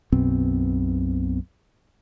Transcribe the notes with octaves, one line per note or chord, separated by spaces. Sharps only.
B1 F#2 B2 C4